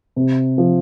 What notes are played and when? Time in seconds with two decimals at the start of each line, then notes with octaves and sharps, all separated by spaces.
0.16 C3
0.58 F3